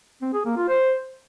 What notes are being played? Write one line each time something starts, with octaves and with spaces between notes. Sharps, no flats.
C4
G#4
A#3
F4
C5